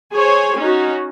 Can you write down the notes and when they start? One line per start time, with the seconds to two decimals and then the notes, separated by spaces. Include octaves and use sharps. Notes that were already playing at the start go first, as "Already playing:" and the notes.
0.14 G#4 C5 C#5 G#5
0.59 C#4 D#4 F#4